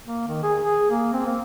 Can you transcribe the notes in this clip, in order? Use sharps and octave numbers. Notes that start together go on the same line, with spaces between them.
A#3
D#3
G#4
G#4
A#3
C4
A#3